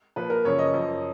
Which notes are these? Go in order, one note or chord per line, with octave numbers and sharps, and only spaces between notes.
A#2 F3 B4
A#4
F#2 C#3 F3 C#5
D#5
F#2 F3